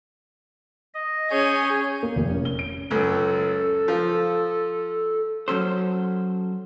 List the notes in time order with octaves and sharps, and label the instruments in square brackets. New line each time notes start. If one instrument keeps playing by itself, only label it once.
[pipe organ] D#5
[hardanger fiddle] C#4 G#5 [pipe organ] G#4 C#5 G6
[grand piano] A#3
F1
C#4
G7
D7
[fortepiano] C#2 F#2 [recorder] A4
[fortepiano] F3
[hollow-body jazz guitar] F#3 C#4 A4 C5